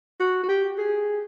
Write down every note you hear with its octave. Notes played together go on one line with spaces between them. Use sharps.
F#4
F#4
G4
G#4